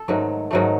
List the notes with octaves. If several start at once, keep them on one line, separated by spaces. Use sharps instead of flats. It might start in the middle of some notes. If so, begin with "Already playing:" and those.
Already playing: A4
G#2 D#3 F#3 A3
G#2 D#3 F#3 A3